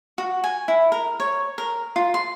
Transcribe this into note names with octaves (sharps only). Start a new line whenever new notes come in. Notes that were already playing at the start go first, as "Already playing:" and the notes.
F#4
G#5
E4
A#4
C#5
A#4
F4
C6